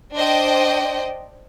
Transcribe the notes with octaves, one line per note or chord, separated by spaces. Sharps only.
D4 C5 D#5 G5